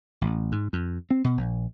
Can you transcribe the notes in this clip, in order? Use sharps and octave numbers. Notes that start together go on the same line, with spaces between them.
A1
G#2
F2
C4
B2
A#1